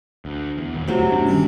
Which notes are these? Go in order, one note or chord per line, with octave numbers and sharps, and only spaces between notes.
D2
E2
D#2 A#2
E1 E2 C3 F#3 A3
G1 D4
D#3 G3 C#4